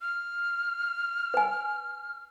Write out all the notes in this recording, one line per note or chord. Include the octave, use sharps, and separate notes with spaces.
F6
B4 G#5